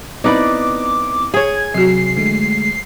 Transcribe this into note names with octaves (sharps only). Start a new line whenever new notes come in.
B3 C4 D#4 E4 B4 D5 D6
G#4 C#5 G#6
C3 F#3 F#4 C7
D3 G#3 A3